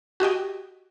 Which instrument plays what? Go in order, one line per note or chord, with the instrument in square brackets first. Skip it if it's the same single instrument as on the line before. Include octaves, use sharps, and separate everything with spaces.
[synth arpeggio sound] F#4 G4 D#5 G5